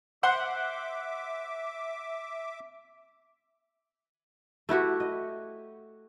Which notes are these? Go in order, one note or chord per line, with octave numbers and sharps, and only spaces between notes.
C5 E5 F#5 C6 D6
A3 E4 F#4 G4
D#5